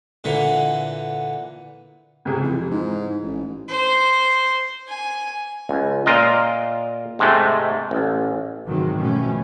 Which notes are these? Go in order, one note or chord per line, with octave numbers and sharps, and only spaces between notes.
A#2 D3 E3
C#2 C3 G#4
F2 E3
G#2
A1
C5
G#5
C#2
A#2 F4 A#4 D#5
G#2 C3 G#3 A3
A1
G#2 C3 D#3 E3 F#3 G#3
B2 F3 A3 C#4